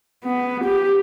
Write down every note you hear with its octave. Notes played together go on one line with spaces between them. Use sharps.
B3
G4